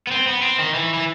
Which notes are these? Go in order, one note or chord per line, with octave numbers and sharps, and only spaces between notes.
B3
C4
B3
C4
D#3
E3
E3